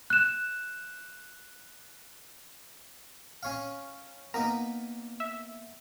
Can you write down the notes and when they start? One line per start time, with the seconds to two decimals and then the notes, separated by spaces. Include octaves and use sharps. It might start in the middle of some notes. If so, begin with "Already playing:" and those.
0.10 F#6 E7
3.43 C#4 C#5 F5
4.34 A#3 B3 D#4 A#4
5.20 E5